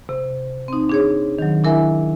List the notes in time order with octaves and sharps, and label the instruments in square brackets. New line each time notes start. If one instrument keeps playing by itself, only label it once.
[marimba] C3
C4 D#4
D4 G#4 C#5
D#3 F#3
D4 E4 A#4 E5 G#5